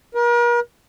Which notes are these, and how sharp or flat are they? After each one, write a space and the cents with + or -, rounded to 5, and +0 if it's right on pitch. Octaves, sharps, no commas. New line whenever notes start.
A#4 +40